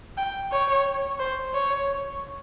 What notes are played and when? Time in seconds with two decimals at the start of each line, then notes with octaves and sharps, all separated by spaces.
0.18 G5
0.52 C#5
1.19 C5
1.54 C#5